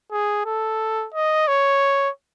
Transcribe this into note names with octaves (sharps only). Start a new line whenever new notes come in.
G#4
A4
D#5
C#5